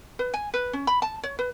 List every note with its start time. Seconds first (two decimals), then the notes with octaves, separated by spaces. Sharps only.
0.19 B4
0.34 G#5
0.54 B4
0.73 C#4
0.87 B5
1.02 A5
1.23 C#5
1.39 B4